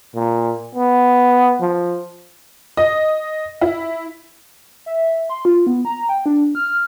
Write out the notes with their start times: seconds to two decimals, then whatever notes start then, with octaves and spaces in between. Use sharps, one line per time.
0.15 A#2
0.75 B3
1.61 F3
2.77 D#5
3.61 E4
4.86 E5
5.30 C6
5.45 F4
5.67 B3
5.85 A#5
6.09 G5
6.26 D4
6.55 F6